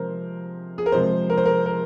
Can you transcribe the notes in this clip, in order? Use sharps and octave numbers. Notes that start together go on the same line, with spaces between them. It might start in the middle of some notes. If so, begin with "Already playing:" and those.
Already playing: C3 F3 G#3 A#4 C5
G#4
A#4
C3 F3 G#3 C5
A#4
C5
A#4
A#4